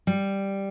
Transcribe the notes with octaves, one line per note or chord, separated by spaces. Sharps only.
G3